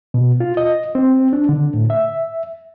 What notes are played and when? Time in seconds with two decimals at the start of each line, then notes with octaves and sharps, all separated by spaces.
0.14 B2
0.40 F4
0.57 D#5
0.95 C4
1.33 D4
1.49 D3
1.74 A2
1.90 E5